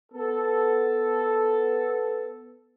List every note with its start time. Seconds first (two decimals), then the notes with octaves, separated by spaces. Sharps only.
0.12 B3 A4